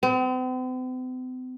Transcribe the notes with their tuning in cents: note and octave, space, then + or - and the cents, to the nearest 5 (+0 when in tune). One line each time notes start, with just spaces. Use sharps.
C4 -45